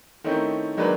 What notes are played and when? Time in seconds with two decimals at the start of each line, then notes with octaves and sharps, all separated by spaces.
0.24 D#3 A3 C4 C#4 D#4 E4
0.77 D#3 F#3 G#3 A#3 D4 B4